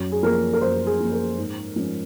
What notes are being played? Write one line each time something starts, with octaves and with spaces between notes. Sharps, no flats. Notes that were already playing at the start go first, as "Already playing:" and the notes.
Already playing: F#2
G#4
F3 A#3 A#4
A#4
F#2 C5
G#4
F3 A#3
A#4
G#2
F3 G#3 C#4